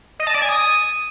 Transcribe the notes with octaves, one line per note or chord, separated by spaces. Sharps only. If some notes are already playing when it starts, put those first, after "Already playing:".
D#5
A5
D5
G#5
D#6